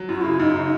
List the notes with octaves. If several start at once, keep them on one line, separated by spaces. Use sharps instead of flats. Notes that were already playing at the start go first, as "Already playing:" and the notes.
Already playing: F#3
F#2 E4
F#4
C#3 E4
F#2 D#4
C#3
D#4